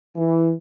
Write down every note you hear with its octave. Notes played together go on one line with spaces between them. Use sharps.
E3